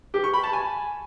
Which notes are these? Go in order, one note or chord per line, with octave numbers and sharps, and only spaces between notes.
G4
C#6
B5
A5
G#5